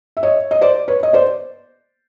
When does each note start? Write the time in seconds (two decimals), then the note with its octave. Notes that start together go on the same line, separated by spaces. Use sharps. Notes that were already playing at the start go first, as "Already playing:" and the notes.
0.17 E5
0.23 C#5 D#5
0.51 D#5
0.61 C5 D5
0.88 B4 C#5
1.03 D#5
1.13 C5 D5